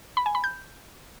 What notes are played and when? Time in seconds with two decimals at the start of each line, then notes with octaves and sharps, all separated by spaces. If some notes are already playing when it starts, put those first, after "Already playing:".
0.17 B5
0.26 G#5
0.35 B5
0.44 G6